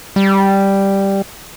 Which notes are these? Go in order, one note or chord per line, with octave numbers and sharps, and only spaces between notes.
G3